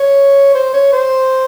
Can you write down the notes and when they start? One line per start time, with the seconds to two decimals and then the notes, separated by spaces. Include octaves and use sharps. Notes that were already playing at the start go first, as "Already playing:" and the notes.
Already playing: C#5
0.55 C5
0.73 C#5
0.92 C5